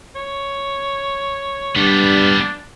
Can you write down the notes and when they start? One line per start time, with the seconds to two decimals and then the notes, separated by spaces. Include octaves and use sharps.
0.16 C#5
1.76 G2 G3 B3 D4